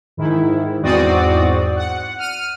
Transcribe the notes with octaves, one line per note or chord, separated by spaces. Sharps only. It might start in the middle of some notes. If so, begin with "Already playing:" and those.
G#2 D#3 E4
E2 G#2 C4 F#4 D5 D#6
F#5
F6 D#7